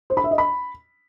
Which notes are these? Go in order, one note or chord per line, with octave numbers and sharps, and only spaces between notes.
C5
B5
E5
D#5
B5